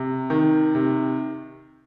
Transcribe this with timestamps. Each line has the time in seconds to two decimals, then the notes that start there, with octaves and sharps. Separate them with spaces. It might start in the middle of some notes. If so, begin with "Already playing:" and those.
Already playing: C3
0.30 D#3
0.75 C3